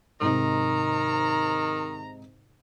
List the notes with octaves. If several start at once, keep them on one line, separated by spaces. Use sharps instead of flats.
G#2 C3 D#3 D#4 A#5